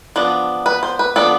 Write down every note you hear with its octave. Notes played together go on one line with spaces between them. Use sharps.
F3 B3 D4
B4
C5
B4
F3 B3 D4 A4